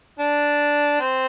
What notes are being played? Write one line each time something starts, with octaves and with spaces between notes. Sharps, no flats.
D4
C4